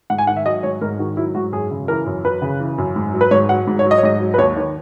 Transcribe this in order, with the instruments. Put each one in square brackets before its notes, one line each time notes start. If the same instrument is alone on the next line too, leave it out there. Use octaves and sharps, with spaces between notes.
[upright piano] G#2 F#5
G#5
D#3 F#5
E5
F#3 D#5
G#2 C#5
G#2 A#4
D#3 F#4
F#3 E4
G#2 F#4
F#2 G#4
C#3
E3 A#4
F#2
F#2 B4
C#3
E3
F#2
G#2
F#3
B4
G#2 C#5
F#3 F#5
G#2
C#5
F#3
D#5
C#5
G#2 D#5
F#3
B4
D#2 C#5
D#3 C#5